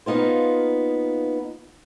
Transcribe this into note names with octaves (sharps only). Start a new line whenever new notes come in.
A#3 B3 D#4 F4 C5